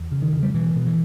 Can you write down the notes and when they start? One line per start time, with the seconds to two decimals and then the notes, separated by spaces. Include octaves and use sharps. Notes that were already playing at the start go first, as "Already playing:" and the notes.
Already playing: E2
0.12 C#3
0.22 D#3
0.33 C#3
0.43 G3
0.54 B2 E3
0.76 B2
0.87 E3